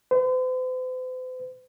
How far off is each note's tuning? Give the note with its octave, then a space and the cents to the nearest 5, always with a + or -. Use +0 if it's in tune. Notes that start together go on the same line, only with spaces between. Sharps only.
C5 -45